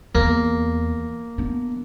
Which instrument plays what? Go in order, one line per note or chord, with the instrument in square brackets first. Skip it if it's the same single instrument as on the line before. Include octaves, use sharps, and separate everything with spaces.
[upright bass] E2 [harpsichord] A#3
[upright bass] B3 D4